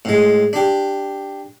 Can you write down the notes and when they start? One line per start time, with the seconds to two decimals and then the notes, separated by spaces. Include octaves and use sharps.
0.05 A2 G#3
0.53 D4 G4